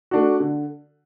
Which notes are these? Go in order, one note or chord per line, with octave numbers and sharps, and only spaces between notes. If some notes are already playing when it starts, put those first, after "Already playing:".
A3 D4 F#4
D3